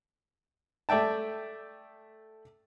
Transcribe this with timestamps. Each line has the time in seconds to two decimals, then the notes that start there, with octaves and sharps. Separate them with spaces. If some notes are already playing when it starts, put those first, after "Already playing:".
0.89 A3 D5 E5 G5 A5